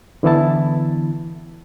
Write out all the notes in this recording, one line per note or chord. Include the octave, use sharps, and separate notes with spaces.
D3 E3 B3 E4 A5